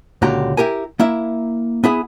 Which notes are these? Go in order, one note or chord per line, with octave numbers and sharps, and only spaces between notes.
C#2 A#2 D3 F#4 G4 A#5
E4 G4 A#4 G#5
A#3 E4 E5
B3 E4 G#4